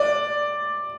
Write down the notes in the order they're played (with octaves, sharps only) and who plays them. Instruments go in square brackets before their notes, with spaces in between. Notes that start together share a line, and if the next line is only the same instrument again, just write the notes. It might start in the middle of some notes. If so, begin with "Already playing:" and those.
Already playing: [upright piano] D5